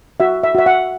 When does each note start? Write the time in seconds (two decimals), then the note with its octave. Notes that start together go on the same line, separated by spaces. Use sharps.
0.20 F#4 E5
0.43 E5
0.55 F#4 E5
0.66 F#5